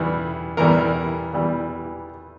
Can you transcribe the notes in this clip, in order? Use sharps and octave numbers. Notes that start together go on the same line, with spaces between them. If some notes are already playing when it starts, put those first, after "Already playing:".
Already playing: E2 E3 G3
E2 E3 G3 A#4
E2 E3 G3